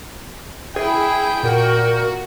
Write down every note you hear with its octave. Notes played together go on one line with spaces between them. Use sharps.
E4 G#4 G5
A#2 F#4 A#4